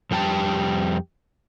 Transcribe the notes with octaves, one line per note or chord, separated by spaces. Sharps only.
F2 G3 G4 G#5 A5